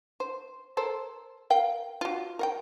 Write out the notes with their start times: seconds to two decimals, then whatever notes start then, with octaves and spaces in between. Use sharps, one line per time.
0.20 C5
0.77 A4 A#4 C5
1.50 A#4 F5 G5
2.01 F4 F#4
2.39 A#4 F#5 G5